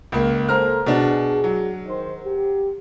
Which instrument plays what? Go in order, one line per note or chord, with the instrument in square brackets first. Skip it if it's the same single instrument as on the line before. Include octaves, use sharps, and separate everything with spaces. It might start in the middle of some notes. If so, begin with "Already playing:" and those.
[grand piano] C#2 A#3
[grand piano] A#3 A#5 F6 [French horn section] A4 C5
[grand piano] B2 D4 [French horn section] G#4
[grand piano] F#3
[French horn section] D#3 C5
G4